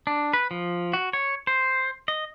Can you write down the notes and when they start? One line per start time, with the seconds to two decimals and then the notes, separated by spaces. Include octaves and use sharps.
0.07 D4
0.34 B4
0.51 F3
0.93 F#4
1.13 C#5
1.47 C5
2.08 D#5